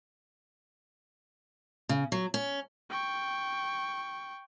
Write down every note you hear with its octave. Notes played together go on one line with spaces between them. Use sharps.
C#3
F#3
C#4
G5 C#6